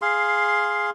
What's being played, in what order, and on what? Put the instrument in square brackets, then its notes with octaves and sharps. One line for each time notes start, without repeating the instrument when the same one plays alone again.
[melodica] G#4 F5 C6